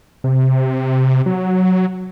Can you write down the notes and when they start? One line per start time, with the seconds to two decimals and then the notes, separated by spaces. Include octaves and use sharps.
0.24 C3
1.26 F#3